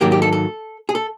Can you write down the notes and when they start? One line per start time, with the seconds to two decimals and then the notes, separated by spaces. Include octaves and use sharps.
0.01 G#2 D#3 F#3 A#3 G4
0.12 G4
0.22 A4
0.33 A4
0.89 G#4
0.95 A4